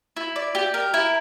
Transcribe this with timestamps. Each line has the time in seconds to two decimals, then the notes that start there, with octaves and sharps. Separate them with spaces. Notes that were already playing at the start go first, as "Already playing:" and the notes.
0.17 E4
0.36 D5
0.55 G4
0.74 A#4
0.94 E4